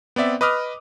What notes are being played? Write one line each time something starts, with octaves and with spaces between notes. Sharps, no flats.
B3 C4 D5 E5
B4 D#5 D6 D#6 F6